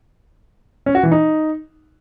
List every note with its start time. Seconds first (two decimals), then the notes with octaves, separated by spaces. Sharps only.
0.86 C#4
0.95 F#4
1.03 E3
1.12 D#4